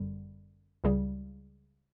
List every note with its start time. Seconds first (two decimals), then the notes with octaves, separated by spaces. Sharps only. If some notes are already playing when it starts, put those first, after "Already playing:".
Already playing: G1 F#2 D3 G3
0.84 C#2 C#3 G3